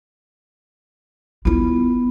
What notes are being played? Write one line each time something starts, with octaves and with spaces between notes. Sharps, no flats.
B3 E4 F4